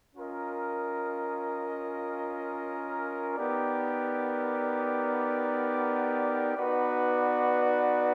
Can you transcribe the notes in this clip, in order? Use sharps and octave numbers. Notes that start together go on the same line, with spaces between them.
C#4 F4 A#4 D#5
B3 D#4 G4 A#4 D5
B3 D#4 F#4 B4 D5